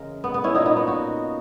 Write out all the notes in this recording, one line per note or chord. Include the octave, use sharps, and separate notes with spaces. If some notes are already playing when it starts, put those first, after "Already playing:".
Already playing: C#3 E3 G#3 A#4
B3
B3
C#4 E4
A#2 A#3 B3 D#4
B3 D#4
B3 D#4
D#4 F#4